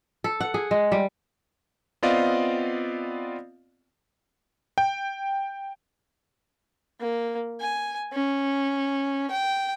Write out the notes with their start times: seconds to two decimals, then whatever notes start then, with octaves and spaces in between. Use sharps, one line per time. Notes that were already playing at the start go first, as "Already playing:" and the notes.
0.24 A4
0.41 F#5
0.54 G#4
0.71 G#3
0.92 G3
2.03 B3 C4 F4 D5 D#5 F5
4.78 G5
7.00 A#3
7.61 G#5
8.13 C#4
9.30 G5